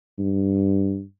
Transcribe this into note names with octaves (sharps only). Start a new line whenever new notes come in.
G2